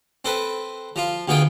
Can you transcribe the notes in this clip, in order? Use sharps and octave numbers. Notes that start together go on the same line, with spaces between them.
C4 A4 B4
F3 F4
D2 B2 F4 G#4 G5